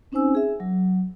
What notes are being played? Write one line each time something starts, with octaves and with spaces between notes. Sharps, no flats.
C4 C#4 D#4 C5 G#5 E6
G#4 E5
F#3